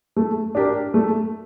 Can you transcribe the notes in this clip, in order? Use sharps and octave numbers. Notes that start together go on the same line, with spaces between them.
A3
D4 G4 A#4
A3